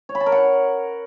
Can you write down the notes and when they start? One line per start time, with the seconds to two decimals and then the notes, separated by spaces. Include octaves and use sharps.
0.09 C#5
0.15 B5
0.21 A5
0.26 A#4
0.32 F#5